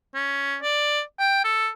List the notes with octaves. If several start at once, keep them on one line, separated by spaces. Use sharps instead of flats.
C#4
D5
G5
A4